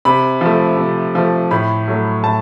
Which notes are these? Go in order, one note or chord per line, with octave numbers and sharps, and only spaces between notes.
C3 B5
F3 A3
C3
F3 A3
A2 B5
F#3 A3
A2 A5